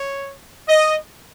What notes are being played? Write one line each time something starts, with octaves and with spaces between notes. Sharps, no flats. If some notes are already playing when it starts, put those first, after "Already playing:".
Already playing: C#5
D#5